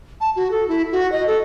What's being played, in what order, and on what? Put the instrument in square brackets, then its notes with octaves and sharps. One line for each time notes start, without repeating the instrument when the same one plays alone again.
[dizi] A5
F#4
A4
E4
F#4
D#5
A4